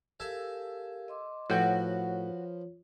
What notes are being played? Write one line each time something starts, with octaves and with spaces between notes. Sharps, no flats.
G4 A4 A#4 E5 F5 G#5
D#5 C6 D6
A2 F3 F4 F#4 B4 C#5 G5